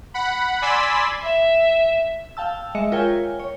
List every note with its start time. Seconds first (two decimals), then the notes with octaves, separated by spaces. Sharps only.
0.14 F#5 B5
0.62 D5 G#5 B5 C6 E6 B6
1.22 E5
2.37 F5 G5 A5 E6
2.75 G#3 D#5 E5 C#7
2.92 F4 A#4 C#5 G5 G#5
3.39 C#5